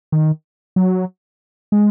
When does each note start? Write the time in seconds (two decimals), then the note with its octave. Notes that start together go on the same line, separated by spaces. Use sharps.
0.12 D#3
0.76 F#3
1.72 G#3